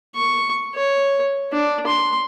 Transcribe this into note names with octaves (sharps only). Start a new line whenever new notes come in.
C#6
C#5
D4
C6